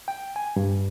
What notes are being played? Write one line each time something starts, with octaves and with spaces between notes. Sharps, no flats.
G5
G#5
G2